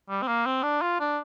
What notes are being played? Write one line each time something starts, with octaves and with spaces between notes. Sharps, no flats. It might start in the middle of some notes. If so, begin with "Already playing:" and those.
G3
C4
A#3
C4
D4
F4
D4